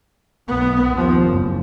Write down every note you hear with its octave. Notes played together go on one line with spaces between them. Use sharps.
B1 B3
D#2 F3
F#1